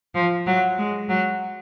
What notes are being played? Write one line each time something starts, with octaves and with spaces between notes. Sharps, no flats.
F3
F#3
G#3
F#3